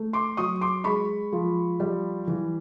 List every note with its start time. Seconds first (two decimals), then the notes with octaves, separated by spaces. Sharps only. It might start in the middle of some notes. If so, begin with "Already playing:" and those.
Already playing: A3
0.13 C6 D6
0.37 F#3 C#6 D#6
0.61 C6 D6
0.84 G#3 B5 C#6
1.32 F3
1.80 G3
2.27 E3